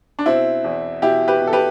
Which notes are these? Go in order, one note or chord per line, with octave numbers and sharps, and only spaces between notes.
D4
B2 C4 E4
E2
B2 E4 G4
G4 B4
B2
A4
G4 B4